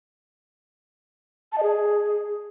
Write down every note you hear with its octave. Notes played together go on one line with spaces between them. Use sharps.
A5
D#5
G#4